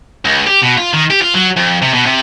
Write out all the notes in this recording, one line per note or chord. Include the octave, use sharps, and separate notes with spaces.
C#2
G4
B2
F4
D#3
G4
F4
F#3
F2
C3
B2
C3